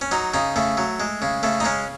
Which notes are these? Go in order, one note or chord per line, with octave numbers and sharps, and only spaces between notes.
C#4
F#3 D#4
C#3 D#4
C#3 A3
F#3
G#3
C#3
C#3 A3
D#4
G#3 C#4